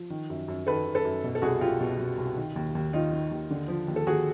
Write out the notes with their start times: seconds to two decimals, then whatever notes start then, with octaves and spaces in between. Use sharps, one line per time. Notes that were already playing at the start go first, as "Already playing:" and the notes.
Already playing: F3
0.10 D#3
0.30 F#2
0.48 F#2
0.67 D#3 A4 B4
0.86 D#3
0.95 A4 B4
1.05 F#2
1.24 B2
1.35 A4
1.42 C2 F#4 G#4
1.61 C2 F4 G4
1.81 B2
1.99 B2
2.17 C2
2.37 D#3
2.56 D#2
2.75 D#2
2.93 D#3 D#4 F4
3.13 D#3
3.31 D#2
3.50 D3
3.68 F3
3.88 D#2
3.96 A4
4.07 D#2 F#4 G#4